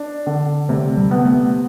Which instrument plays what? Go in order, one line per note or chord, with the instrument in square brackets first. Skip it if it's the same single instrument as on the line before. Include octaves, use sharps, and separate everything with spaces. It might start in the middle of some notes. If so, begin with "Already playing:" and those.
Already playing: [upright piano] D4
D3
[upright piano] C3 [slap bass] A3
[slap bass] G3
[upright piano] B3
[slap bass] A3